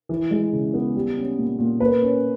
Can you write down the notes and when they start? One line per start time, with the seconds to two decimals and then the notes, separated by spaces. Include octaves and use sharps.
0.09 E3
0.31 G#3
0.53 C#3
0.74 B3
0.95 G3
1.16 C#4
1.37 A#2
1.59 A#2
1.80 A#3 B4
2.02 C#4